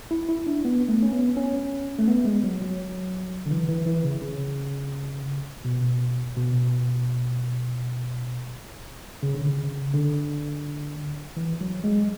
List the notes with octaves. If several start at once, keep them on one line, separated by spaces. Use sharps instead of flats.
E4
E4
D4
B3
A3
C#4
B3
C#4
A3
B3
G#3
F#3
F#3
D3
E3
E3
E3
C#3
C#3
B2
B2
C#3
D3
C#3
D3
E3
F#3
G#3